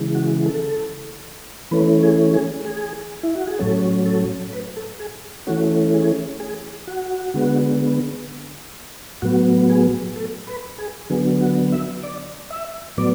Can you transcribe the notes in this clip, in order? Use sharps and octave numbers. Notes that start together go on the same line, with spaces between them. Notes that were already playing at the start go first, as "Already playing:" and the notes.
Already playing: C#3 E3 G#3
F#4
A4
E3 A3 C#4 B4
G#4
G#4
G#4
E4
F#4
G#4
A2 F#3 C#4 A4
A4
B4
A4
G#4
E3 A3 C#4 F#4
G#4
G#4
F#4
D3 G#3 B3
A2 F#3 B3 F#4
G#4
A4
B4
G#4
D3 F#3 B3 G#4
F#4
E5
D5
E5
A2 F#3 B3 D5